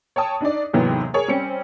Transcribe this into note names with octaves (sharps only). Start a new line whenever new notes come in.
C#5 G5 A5 D#6
D4 D#4 D5
D#2 G#2 C3 E3 F#3 B3
G#4 A#4 C#5
G3 C4 C#4 C#7